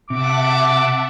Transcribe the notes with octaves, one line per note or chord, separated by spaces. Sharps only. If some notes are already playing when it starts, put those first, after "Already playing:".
C3 E5 F#5 A5 D6